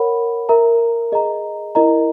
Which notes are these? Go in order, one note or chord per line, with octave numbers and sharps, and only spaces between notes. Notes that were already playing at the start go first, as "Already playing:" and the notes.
Already playing: A#4 C#5 F#5 B5
A#4 E5 A#5
G#4 D#5 A#5
E4 A#4 D#5 A#5